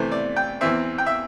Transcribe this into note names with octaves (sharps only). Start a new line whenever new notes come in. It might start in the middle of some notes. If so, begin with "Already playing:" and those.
Already playing: C3 E3 A3 C5
D5
G5
E2 E3 C4 E5
G5
E5